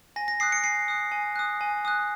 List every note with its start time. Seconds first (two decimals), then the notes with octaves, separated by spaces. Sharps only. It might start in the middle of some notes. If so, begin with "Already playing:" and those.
0.16 G#5 A#6
0.28 A#6
0.40 D#6 F#6 C7
0.52 C#7
0.64 G#5 C7
0.88 D#6 F#6
1.12 G#5
1.36 D#6 F#6
1.61 G#5
1.85 D#6 F#6